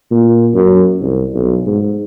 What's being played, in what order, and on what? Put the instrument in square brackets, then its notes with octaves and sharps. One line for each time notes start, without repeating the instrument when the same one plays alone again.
[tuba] A#2
F#2
C2
B1
G#2